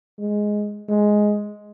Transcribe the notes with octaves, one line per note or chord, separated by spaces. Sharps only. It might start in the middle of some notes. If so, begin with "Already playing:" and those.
G#3
G#3